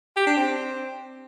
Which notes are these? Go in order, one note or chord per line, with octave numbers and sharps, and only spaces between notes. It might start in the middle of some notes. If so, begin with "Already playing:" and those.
G4
D4
C4